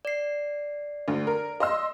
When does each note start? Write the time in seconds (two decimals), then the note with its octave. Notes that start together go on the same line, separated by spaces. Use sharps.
0.05 D5 C7
1.08 D2
1.27 A#4
1.60 D#5 C6 E6